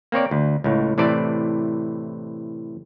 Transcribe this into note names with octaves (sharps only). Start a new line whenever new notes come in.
A#3 C4 C#5 D5
D2
C#2 A2
A2 C3 E3 D5 A5